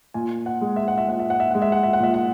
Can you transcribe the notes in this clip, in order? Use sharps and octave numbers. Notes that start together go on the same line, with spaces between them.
A#2 G#5
F#5
G#3
E5
F#5
E5
A#2 F#5
E5
F#5
E5
G#3 F#5
E5
F#5
E5
F#5
A#2 E5
F#5